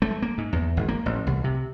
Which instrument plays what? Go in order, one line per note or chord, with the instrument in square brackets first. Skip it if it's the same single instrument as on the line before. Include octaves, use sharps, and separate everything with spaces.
[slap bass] A3
A#3
G#2
E2
G#1
A#3
A1
C2
C3